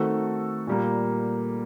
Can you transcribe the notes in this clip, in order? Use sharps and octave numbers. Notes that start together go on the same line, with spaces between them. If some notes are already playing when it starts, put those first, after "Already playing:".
Already playing: D#3 A3 C4 F#4 A4
A#2 G3 A#3